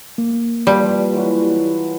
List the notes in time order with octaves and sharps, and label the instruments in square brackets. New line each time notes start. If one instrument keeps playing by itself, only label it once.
[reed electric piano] A#3
[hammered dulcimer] F3 B4 C6 [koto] G3
[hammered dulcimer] E3 F#3